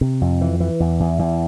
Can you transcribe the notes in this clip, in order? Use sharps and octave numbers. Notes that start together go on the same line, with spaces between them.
C3
F2
E3
E3
E2
E2
E2